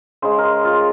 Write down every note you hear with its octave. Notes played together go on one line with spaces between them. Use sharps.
C#3 G#3 C5
A#4
G#4
F4